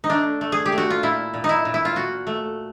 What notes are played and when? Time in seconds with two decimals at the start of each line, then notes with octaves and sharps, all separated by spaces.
0.04 D#4
0.10 A3 D4
0.41 A3
0.52 G#4
0.66 G4
0.72 A3
0.78 F#4
0.90 F4
1.03 A#2 E4
1.34 A#2
1.44 D#4
1.49 E4
1.65 A#2
1.74 E4
1.85 F4
1.96 A#2 F#4
2.27 A3